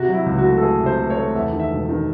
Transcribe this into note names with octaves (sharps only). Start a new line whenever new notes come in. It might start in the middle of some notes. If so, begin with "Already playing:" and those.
Already playing: C3 F#4
F#3
E4
C#2
F#4
A3
A4
A3 G#4
C3
C5
A3
C#5
A3
E2 E5
D#3
E5
E1
D#3